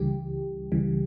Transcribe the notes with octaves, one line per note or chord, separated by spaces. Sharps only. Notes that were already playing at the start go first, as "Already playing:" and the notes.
Already playing: C#2 C#3 E3 G3 G4
C#2 C#3 E3 G3